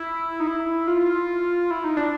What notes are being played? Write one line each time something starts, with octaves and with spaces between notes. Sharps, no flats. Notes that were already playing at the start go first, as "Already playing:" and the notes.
Already playing: E4
D#4
E4
F4
E4
D#4
D4